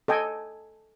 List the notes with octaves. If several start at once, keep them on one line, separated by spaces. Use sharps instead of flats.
A4 D#5 G5 G#5